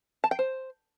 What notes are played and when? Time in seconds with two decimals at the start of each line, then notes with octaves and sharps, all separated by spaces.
0.24 A5
0.31 G5
0.39 C5